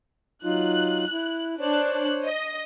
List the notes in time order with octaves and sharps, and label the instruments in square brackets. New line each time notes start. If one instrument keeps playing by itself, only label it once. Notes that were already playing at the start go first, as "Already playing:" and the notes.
[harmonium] F#3 D#4 F4 [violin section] F#6
[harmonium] E4
[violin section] D4 F#6 [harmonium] C5 C#5
[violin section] D#5